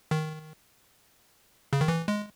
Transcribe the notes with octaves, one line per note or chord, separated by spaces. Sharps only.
D#3
C#3
D#3
E3
G#3